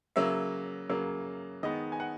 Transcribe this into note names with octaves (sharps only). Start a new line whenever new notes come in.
C#3 F#3 A#3 E5
C#3 F#3 A#3
D#3 G#3 B3 D#5
G#5
F#5